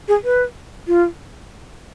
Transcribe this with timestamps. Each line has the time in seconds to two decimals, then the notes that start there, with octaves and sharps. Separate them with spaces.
0.08 G#4
0.24 B4
0.87 F4